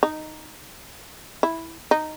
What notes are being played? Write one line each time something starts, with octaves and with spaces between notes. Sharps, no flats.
D#4
E4
D#4